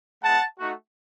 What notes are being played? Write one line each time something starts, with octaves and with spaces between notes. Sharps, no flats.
G#3 B3 E4 F#5 A5
A3 D#4 F#4